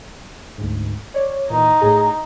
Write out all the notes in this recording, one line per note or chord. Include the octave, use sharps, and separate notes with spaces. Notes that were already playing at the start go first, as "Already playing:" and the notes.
D2 G#2
C#5 D5
A#2 E3 D#4
A2 G#4 A#5